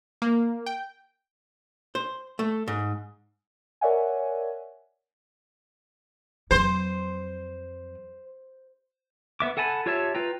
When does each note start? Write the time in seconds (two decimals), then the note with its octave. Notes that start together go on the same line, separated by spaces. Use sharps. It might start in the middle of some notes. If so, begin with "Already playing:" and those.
0.22 A#3
0.66 G5
1.95 C5
2.39 A3
2.68 G#2
3.81 A#4 C#5 D5 E5 F#5 G#5
6.51 F2 F#3 C5
9.40 B3 E5 D6
9.57 A4 F#5 G#5 A5 B5
9.86 F4 G4 C#5 E5 A5
10.15 F4 B4 G5 A#5